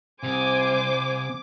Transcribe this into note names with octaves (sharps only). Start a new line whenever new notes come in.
C2 C3 C5 G#5 D6